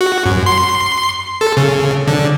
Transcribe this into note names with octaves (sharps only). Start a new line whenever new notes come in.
F#4
F#2
C6
A4
C#3
D3